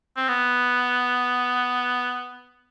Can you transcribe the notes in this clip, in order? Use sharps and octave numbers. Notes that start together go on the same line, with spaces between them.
C4
B3